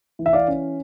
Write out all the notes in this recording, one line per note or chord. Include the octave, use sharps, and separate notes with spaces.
E3
E5
D5 F5
C#4